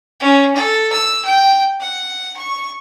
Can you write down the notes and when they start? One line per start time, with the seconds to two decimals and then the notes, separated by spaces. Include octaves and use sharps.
0.20 C#4
0.56 A4
0.92 E6
1.25 G5
1.80 F#5
2.36 C#6